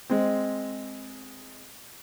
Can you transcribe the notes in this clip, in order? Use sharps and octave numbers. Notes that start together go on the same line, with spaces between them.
G#3 C4